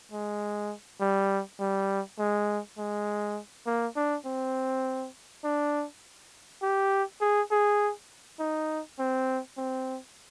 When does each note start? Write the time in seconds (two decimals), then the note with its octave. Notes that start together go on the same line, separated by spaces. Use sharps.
0.12 G#3
1.01 G3
1.60 G3
2.19 G#3
2.78 G#3
3.66 A#3
3.96 D4
4.26 C4
5.44 D4
6.62 G4
7.21 G#4
7.51 G#4
8.40 D#4
8.99 C4
9.58 C4